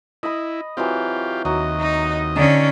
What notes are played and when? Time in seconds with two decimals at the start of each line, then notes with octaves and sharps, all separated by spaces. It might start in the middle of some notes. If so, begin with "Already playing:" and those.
0.23 E4 D#5 B5
0.77 E3 F#3 C4 F4 G4
1.45 D#2 F#3 D#5
1.81 D#4
2.36 D3 C#4 D#4